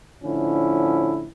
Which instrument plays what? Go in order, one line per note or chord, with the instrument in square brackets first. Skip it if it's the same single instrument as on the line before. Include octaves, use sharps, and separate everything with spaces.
[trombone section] A2 D3 F3 C#4 E4